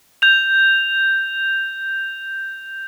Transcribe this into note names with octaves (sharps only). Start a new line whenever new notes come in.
G6 F7